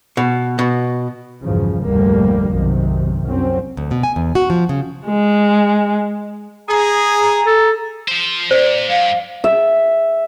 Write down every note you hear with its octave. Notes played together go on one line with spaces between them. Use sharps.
B2
B2
B1 E2 G2 C#3 F3
F1 D2 G#2 G3 A#3
B1 F#2 C3 D#3
C2 F#2 F#3 C4 C#4
D2
B2
G#5
E2
F#4
F3
C#3
G#3
G#4 A#5
A4
F3 C5
A#2 C5 D5
G2 F5
E5